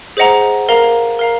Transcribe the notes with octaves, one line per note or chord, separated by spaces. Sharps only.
G#4 C5 D#5 F#5 A#5
A#4 F5 A#5
A#4 F5 A#5